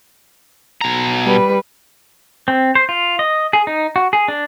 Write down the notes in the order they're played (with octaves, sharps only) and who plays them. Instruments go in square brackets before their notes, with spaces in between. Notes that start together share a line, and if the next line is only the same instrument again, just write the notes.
[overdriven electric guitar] B2 A#5
[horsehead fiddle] G3 B4
[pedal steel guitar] C4
C5
F4
D#5
G#4
D#4
F#4
G#4
D4